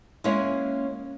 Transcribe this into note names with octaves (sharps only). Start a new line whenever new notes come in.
G#3 A#3 C#4 E4 C#5